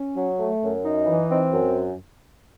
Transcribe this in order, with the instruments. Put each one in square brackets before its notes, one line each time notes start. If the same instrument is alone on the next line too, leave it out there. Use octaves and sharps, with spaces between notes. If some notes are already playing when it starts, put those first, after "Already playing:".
Already playing: [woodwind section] C#4
F#3
A3
F#2
D#4
E3
C4
F#2